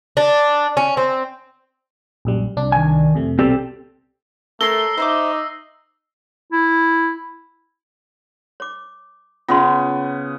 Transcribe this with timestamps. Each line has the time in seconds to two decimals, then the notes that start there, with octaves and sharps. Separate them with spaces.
0.17 D4
0.77 C#4
0.97 C4
2.25 A#1 F#2 G3
2.57 C2 D4
2.72 D#3 G#5
3.14 F2 C3 A3
3.39 C2 B2 G3 C4 G4 A4
4.61 A3 A4 A#4 C#5 E6 A#6 C7 G7
4.98 D#4 C5 E5 D6
6.52 E4
8.60 C#5 D6
9.48 C#3 B3 F4 C6